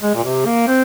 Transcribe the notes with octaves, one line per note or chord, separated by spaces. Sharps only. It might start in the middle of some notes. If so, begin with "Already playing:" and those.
G#3
A#2
C3
A#3
C4